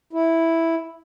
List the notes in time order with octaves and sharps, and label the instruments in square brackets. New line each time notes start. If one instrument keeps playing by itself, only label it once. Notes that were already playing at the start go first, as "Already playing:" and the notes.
[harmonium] E4